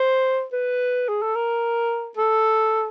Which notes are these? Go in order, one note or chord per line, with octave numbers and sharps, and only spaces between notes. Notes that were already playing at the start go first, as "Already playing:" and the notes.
Already playing: C5
B4
G#4
A4
A#4
A4